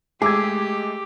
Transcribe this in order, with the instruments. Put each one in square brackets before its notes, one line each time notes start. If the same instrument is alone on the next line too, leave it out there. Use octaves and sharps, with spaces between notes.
[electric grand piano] G#3 A3 [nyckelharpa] G4 [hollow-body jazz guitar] G#4 [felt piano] D6 E6 G#6